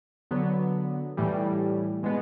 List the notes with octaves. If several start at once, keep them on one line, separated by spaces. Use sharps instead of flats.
D3 F#3 B3
A2 E3 G3
B2 G#3 B3